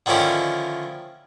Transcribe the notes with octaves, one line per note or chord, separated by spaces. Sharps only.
D3 D#3 F3 C#4 E4